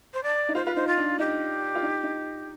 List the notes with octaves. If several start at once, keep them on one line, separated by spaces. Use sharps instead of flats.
C5
D5
D#4
F4 C5
F4 B4
D#4 C5
F4
D4
D#4 G4
F4
D#4
D#4